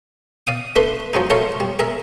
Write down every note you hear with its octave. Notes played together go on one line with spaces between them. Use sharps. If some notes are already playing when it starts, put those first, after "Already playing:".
D5 F5 D#6
A3 D4 B4 B5 C6
F3 F#3 G#3 D#4
F4 A4 A#4 C#5 E5 F5
G3
G#4 A#4 E5